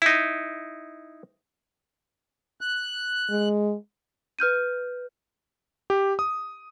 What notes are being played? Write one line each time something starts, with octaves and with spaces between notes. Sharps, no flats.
D#4 E4
F#6
G#3
B4 F6 G6 D#7
G4
D#6